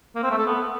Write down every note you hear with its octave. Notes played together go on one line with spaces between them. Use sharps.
A#3
C4
A3
A4
B3